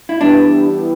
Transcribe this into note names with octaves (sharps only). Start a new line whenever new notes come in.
E4
E3 G3 B3 D4 E4 G4